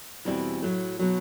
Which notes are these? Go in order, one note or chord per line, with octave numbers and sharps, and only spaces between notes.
E2 B2 G3 C4 E4
A2 F#3 A3
B2 F#3